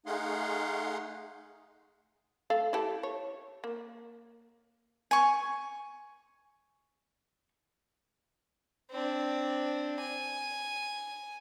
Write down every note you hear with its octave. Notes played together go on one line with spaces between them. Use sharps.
A3 D#4 G#4 F5 F#5 C6
A3 A4 F5
E4 G4 A4
C#5
A#3
G#5 C#6
C4 D4
G#5